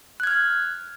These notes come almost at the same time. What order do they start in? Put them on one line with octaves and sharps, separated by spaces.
F#6 G#6 F6